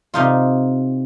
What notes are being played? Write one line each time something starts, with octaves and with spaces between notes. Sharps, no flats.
C3 D#4 F4